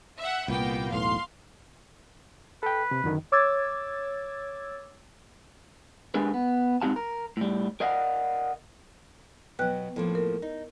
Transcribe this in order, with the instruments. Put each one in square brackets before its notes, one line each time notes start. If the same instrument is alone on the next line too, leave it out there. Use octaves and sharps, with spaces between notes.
[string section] E5 F#5
[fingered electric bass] C2 A#2 [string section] A#3 B3 G5
[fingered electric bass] E1 B1 A2 [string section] F5 C6
[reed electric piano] A4 G5 [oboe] B4
[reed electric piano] C3
F#2 D3 D#3
[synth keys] C#5 D6 E6 G#6 A6
[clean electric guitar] G#3 D4 G4 G#4 A#4 B4
B3
G#2 C4 D#4 G4 F5 A5
A#4
A2 G3
A#4 D5 D#5 F5 F#5
[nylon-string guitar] B2 F#3 [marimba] B4 G5 F#6
[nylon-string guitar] A2 F3 A#3
[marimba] A#4
[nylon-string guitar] D#4